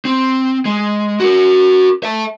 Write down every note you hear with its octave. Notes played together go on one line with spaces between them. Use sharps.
C4
G#3
F#4 A#4
E5 A5